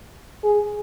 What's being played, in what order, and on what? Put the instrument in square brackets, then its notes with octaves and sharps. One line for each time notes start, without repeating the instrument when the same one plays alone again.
[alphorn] G#4